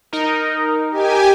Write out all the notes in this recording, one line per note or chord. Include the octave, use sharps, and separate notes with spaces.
D#4 A#4
G4 G#5